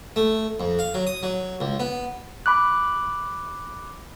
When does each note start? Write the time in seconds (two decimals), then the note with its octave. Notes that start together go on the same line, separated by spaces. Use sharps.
0.16 A3
0.60 F2
0.79 F5
0.94 F#3
1.07 D#6
1.23 F#3
1.61 C#2
1.80 B3
2.46 B5 D6 F#6